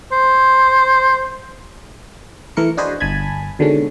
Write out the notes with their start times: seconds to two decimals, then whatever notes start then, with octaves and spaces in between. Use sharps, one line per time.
0.12 C5
2.57 E3 A3 A#4 C#7
2.77 D4 F#4 G#4 B4 C5 D#5
3.00 G1 G#5 A5 B5 G#6
3.59 B2 D3 D#3 G#3 C#4